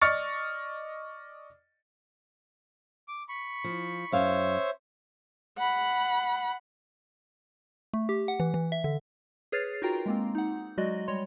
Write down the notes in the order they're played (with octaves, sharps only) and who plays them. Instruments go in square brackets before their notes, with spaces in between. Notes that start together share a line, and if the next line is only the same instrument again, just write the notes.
[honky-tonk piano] D5 D#5 C#6 F6 A6 C#7
[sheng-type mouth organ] D6
B5 C#6
[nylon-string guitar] F3
[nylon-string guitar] F#2 F5 [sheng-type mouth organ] C5 C#5 E5
[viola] F#5 B5
[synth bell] A3
G4
F#5
E3
E3
E5
D3
G#4 B4 C#5 F6 A6 C7
D#4 F4 F#4 A#4 G5 A#5
G#3 A#3 C4
D#4 F#5
F#3 G#3 F#4 D5 D#5
G3 C#5 C6